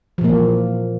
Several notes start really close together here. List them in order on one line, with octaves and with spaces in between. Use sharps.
F3 A#2 A#3 E3